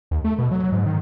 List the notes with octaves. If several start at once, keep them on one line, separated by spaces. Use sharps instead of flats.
D#2
A3
B2
F#3
G#2
D#3